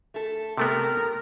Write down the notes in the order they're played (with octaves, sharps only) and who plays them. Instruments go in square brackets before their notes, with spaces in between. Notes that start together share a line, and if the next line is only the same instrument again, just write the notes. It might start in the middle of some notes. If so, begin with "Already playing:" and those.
[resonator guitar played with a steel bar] A3 A4
[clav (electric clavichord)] C3 A3 B3 [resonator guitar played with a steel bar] G4 A4 [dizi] A#4